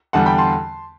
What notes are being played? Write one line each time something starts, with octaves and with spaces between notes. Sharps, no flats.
E2 D3 G3 F#5 A5
G5 B5
A5 C6